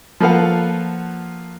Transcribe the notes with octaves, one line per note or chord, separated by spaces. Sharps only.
F3 A#3 A4 B4 F5 F#5